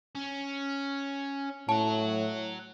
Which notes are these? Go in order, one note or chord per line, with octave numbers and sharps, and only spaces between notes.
C#4
A2 C#5 F#5 A5